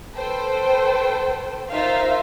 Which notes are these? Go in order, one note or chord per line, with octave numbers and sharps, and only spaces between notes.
A4 B4 C5 G5
D#4 F4 A#4 C5 E5 F5